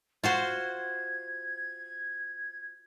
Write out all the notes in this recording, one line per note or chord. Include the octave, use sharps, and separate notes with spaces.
F4 F#4 C5 G#6